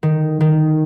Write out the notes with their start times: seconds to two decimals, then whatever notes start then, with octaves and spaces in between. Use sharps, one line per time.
0.03 D#3
0.40 D#3